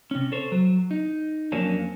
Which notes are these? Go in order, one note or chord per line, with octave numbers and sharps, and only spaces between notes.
C3 C#4
A4 C5 C#5
F#3
D#4
F2 F3 F#3 A#3 C#4 D4